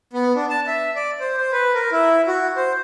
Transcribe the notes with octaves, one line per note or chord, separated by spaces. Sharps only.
B3
D4
A5
E5
D5
C5
C5
B4
A#4
E4
F#4
C5